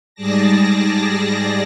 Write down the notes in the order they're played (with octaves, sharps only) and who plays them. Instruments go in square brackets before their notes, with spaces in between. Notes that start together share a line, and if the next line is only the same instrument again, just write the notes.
[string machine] G#2 G3 G#4 D5 A5 A#6